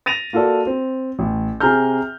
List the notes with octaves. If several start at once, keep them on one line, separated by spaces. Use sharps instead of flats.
A6 A#6 D#7 F7
A#3 F4 F#4 A4 D5
C4
A1
C3 G#4 A#5 F6 G6